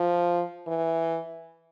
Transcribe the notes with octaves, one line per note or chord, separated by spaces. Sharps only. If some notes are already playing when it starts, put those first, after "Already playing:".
Already playing: F3
E3